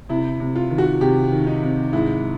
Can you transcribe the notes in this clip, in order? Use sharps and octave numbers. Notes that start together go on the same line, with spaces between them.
C3 E4
C3
F4
D#3
F#4
C3 G4
D#3
D#4
C3
G#2 E4